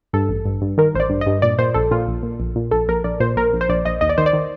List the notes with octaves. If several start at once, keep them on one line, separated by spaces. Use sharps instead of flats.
G2 A4
A1
G2
G2
D#3 A#4
A1 C5
D5
G2
D#5
G2
A#2 D5
A#2 C5
A#1 A4
A#2 F4
A#1
A#2
A#1
A#2
A#1 A4
A#1 A#4
A#1 D5
A#2 C5
A#1 A#4
A#1
C5
A#1 D5
A#1 D#5
D#2 D#5
D5
D#3 C5
D5
D#3